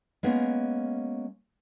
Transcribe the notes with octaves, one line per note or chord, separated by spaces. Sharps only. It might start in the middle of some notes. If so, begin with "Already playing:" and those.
G#3 A#3 B3 C#4